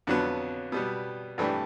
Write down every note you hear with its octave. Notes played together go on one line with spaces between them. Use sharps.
F2 D3 F#3 B3
B2 G3 B3
G2 E3 A3 D4 G4